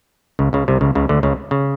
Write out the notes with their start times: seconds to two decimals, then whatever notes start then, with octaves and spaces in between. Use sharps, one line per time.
0.39 C#2 C#3
0.53 C#2 C#3
0.68 C2 C3
0.81 C#2 C#3
0.95 C#2 C#3
1.09 D2 D3
1.23 C#2 C#3
1.51 C#3